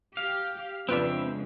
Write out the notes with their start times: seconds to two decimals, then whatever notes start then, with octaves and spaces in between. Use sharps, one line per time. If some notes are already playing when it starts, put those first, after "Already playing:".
0.17 G4 F5
0.89 F2 C#3 G#3 C4 D4 F4 B4 E5